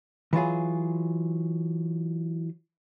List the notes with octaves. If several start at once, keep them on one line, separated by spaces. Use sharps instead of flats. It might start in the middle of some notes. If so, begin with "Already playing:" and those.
E3 F#3 F4 G#4